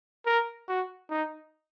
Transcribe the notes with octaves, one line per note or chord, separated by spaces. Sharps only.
A#4
F#4
D#4